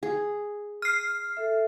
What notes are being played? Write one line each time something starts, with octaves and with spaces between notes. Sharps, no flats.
G#4
F6 C7
A4 E5